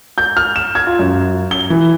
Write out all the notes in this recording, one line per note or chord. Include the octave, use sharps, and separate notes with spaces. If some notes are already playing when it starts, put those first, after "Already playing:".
G6
F6
E7
G#6
F4
F#2
G7
E3